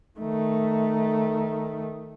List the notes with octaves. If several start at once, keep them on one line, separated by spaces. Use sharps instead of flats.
D#3 A3